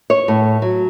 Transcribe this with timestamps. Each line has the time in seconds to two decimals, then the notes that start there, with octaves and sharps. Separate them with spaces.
0.10 C#5
0.28 A2
0.62 F#3